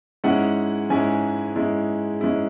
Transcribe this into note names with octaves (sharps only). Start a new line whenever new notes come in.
G#2 G#3 C#4 E4 F#5
G#2 G#3 C#4 E4 G#5
G#2 G#3 C#4 E4
G#2 G#3 C#4 E4